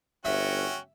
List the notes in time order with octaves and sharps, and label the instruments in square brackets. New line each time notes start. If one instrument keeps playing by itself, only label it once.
[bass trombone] G1 [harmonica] C#4 F#4 G5 [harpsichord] E5